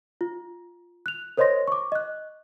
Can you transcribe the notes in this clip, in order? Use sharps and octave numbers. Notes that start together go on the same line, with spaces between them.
F4
F#6 F7
A#4 C5 C#5 D#5 C6 A#6
C#6 D6
D#5 F#6